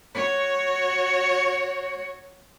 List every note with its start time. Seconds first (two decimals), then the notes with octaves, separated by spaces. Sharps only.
0.14 F#4 C#5